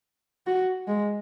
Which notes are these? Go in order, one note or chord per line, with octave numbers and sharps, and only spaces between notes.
F#4
G#3